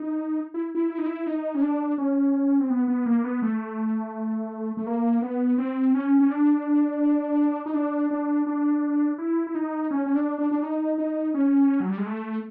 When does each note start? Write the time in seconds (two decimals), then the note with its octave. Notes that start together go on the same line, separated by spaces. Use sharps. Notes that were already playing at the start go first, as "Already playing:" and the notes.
Already playing: D#4
0.54 E4
0.75 E4
0.90 E4
0.98 D#4
1.06 E4
1.27 D#4
1.55 C#4
1.62 D4
1.98 C#4
2.60 C4
2.70 B3
2.88 B3
3.06 A#3
3.24 B3
3.42 A3
4.77 A3
4.87 A#3
5.22 B3
5.58 C4
5.94 C#4
6.19 C#4
6.30 D4
7.66 D#4
7.74 D4
8.11 D4
8.47 D4
9.18 E4
9.47 E4
9.55 D#4
9.91 C#4
10.06 C#4
10.15 D4
10.38 D4
10.51 D4
10.63 D#4
10.98 D#4
11.34 C#4
11.80 F#3
11.89 G3
11.98 G#3
12.06 A3